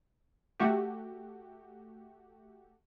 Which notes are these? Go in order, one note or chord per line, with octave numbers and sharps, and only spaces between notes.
A3 F#4 G4